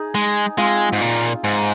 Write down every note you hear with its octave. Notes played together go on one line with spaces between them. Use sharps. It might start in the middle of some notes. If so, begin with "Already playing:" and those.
Already playing: D#4 G#4
G#3
G#3 C4 F4
G#2
A#2
G#2